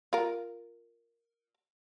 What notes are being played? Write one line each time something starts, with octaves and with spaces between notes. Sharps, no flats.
F4 A#4